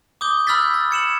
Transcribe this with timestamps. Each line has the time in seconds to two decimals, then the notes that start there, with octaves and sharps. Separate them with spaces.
0.21 D6 D#6 G6 G7
0.47 B5 E6 F6 G6 A6 B6
0.74 A6
0.91 G#6 C#7 E7 F#7